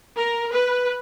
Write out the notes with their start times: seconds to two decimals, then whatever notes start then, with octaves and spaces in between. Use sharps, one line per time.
0.18 A#4
0.52 B4